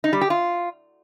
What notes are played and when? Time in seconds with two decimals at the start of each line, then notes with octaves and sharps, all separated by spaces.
0.04 D#4
0.13 G3
0.21 G4
0.30 F4